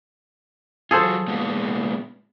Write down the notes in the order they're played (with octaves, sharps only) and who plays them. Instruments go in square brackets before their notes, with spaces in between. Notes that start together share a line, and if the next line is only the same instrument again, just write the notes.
[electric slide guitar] F#3 F4 [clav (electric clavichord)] G#4 A4 C5
[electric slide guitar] A#2 G#3 B3